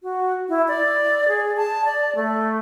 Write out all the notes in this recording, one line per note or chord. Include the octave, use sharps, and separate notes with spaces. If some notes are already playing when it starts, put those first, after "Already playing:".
F#4
E4
D5
G#4
A5
D5
A3